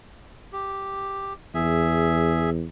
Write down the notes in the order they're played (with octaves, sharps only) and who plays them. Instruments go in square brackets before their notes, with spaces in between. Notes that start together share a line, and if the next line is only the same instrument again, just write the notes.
[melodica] G4
[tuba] E2 [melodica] G#4 E5